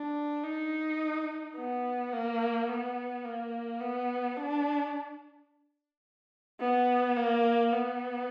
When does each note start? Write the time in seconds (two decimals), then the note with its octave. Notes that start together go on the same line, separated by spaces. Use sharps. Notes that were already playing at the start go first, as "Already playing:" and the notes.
Already playing: D4
0.44 D#4
1.57 B3
2.13 A#3
2.68 B3
3.25 A#3
3.81 B3
4.36 D4
6.60 B3
7.16 A#3
7.72 B3